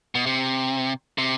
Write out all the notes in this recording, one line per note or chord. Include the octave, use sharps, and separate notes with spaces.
B2
C3
C3